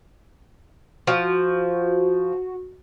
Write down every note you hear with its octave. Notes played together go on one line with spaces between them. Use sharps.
F3 F#4